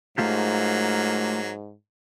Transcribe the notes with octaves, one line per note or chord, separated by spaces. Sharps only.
G#2 F#3 A3 A#3 F4 G4